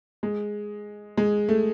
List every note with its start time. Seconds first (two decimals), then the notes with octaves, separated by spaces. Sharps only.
0.23 G#3
1.17 G#3
1.49 A3